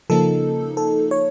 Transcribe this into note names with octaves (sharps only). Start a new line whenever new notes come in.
C#3 F3 A#3 D#4 A4
A4
C#5